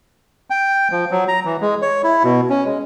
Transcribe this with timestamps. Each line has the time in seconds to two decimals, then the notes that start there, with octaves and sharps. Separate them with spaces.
0.50 G5
0.91 F3
1.11 F#3
1.28 A#5
1.45 E3
1.61 G#3
1.82 C#5
2.04 E4
2.23 B2
2.49 C#4
2.65 G#3